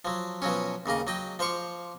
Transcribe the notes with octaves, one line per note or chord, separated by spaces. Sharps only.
F3 F#3
B2 F3 F#3 C#4
D#2 C#3 A#3 D#5
F#3 D#5 G5
F3 C5 F5 C#6 D6